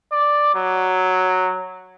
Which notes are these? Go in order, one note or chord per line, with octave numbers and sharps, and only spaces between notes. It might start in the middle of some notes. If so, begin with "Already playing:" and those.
D5
F#3